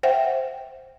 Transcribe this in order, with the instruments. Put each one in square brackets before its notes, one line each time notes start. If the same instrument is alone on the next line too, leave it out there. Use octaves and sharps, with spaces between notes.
[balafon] C5 E5 F#5 G5